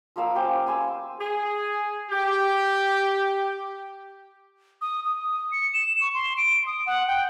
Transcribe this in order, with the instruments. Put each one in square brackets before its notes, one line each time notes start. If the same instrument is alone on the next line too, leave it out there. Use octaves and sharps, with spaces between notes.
[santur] F3 A#3 F5 E6
C#4 G4 C5
G#5 C6 E6
[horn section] G#4
G4
[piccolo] D#6
D#6
C#7
E7
C#6
C6
D7
D#6
F#5
G5